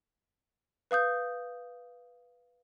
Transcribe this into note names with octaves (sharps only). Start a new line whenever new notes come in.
B4 F5 D#6 G6